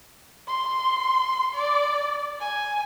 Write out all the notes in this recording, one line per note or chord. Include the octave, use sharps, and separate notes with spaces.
C6
D5
G#5